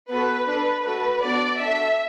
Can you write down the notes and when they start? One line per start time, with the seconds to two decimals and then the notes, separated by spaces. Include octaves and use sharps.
0.10 B3 F#4 A4 B4
0.48 D4 A4 B4
0.85 A3 F#4 A4 B4
1.22 B3 D4 F#4 D5
1.60 D4 F#4 A4 E5